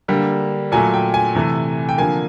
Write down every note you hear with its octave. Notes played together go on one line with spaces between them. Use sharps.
D3 G3 A#3
A#2 F#3 A3 G#5
G5
G#5
C3 E3 A3
G5
D3 F3 A#3 G#5